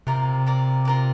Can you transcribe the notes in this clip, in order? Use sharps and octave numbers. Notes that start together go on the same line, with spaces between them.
C3 F4 A#4 D5
F4 A#4 D5
F4 A#4 D5